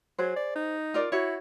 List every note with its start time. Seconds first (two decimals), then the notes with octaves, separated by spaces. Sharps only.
0.19 F#3 G#4 C5
0.36 D5
0.55 D#4
0.94 F4 A#4 D5
1.12 E4 F#4 C#5